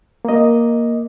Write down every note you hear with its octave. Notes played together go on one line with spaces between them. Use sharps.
A#3 D#5